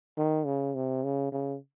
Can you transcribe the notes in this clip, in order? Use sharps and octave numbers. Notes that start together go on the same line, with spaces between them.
D#3
C#3
C3
C#3
C#3